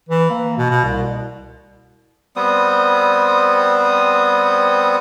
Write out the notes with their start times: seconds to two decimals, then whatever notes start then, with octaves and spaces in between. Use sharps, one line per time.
0.09 E3
0.30 A#3
0.57 B2
0.70 B2
0.84 C2
2.36 G3 B3 C4 D#6